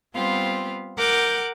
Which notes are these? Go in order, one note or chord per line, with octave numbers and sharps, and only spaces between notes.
G3 B3 C4 F4 F5
A#4 F#5 D6 F#6 G6